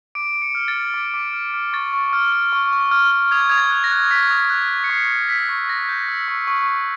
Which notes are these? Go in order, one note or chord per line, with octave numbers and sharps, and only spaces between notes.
D6 D7
D6
C#7
F6
A6
F6
D6
D6
F6
F6
C#6 A6
C#6
F6
F6
C#6
C#6
F6
F6
D#6 G#6
D#6 G#6
A6
F#6
A#6
F#6
D#6 B6
D#6
F#6
F#6
C#7
C#6 C7
G6
E6 B6
C#6
C#6 A#6
G6
E6
C#6
C#6
C#6